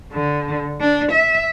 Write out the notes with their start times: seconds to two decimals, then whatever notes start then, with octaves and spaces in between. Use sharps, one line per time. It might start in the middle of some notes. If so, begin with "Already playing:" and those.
0.13 D3
0.80 D4
1.12 E5